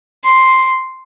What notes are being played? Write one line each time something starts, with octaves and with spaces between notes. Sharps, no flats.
C6